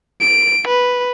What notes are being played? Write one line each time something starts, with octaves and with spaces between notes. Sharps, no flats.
D7
B4